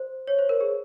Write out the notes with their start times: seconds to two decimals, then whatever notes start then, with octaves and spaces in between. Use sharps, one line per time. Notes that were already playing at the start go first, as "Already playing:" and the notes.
Already playing: C5
0.27 C#5
0.39 C5
0.49 A#4
0.61 G#4